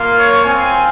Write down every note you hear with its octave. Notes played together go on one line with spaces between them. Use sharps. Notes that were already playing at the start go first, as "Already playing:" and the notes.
Already playing: A#3 F4
C#5
C4 F4 G#5